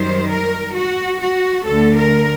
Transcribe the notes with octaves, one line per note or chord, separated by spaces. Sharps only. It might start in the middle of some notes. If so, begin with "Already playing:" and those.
Already playing: F#2 D#3 G3 C5
A#4
F#4
F#4
D2 D3 A3 A4
A#4